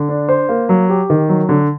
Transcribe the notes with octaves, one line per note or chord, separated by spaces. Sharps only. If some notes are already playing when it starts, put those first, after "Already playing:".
Already playing: D3
D4
C5
A#3
F#3
G4
D#3
F#3
D3